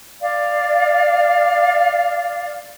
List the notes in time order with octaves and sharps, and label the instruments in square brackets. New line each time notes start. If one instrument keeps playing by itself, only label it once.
[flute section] D5 F5